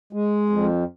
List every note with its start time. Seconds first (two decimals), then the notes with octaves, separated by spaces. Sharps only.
0.13 G#3
0.49 F2